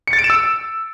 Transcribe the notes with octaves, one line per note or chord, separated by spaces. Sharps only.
C#7
A6
D7
E7
E6